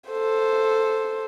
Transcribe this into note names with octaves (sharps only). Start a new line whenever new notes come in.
A4 C5